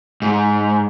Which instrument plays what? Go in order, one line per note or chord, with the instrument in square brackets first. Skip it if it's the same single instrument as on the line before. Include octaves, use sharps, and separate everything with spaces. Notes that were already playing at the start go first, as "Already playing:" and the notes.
[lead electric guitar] G#2